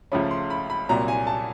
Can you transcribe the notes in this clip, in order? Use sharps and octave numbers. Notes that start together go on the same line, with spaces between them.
C#2 C#3 F3 A3 C#4 B5
C6
B5
B5
C2 A#2 F#3 A#5
G#5
A5